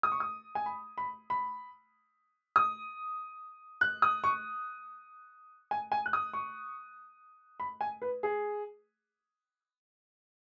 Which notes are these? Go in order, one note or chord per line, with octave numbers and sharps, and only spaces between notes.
D#6
C#6
D#6
G#5
B5
B5
B5
D#6
F#6
D#6
C#6
G#5
G#5
F#6
D#6
C#6
B5
G#5
B4
G#4